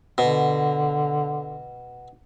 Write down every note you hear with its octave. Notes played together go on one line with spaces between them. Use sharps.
B2 D3